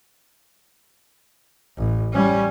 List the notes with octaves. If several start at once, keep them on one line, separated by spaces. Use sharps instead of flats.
A1
G3 C#4